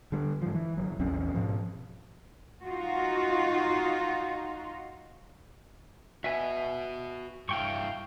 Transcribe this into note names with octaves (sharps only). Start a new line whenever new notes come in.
D3 G3
G#2 F3
E3
G1 F#3
A#1 E2 C4 C#4
G#2 B2 F3
D#4 F4 F#4
F#4 B4 E5 G#5
G2 E4 F5 G5 C#6